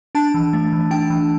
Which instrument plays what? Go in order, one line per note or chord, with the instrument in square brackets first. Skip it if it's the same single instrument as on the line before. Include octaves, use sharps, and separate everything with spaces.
[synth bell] D4 A5
E3
A3
E3
D4 G5
E3